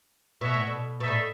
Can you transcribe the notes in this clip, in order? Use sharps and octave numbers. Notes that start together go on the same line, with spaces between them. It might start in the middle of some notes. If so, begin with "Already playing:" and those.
B2 F#4 C#5 E5
A2
B2
B2 D#4 A4 E5
A2